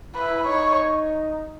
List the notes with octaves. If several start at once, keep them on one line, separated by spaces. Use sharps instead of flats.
E4 B4
D#4 C#5